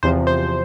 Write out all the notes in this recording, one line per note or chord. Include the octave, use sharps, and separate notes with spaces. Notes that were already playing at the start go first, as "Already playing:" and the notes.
E2 C3 F3 C5
C5